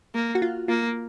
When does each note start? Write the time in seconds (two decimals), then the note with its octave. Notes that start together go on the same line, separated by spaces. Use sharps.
0.15 A#3
0.35 F#4
0.42 F4
0.68 A#3 F4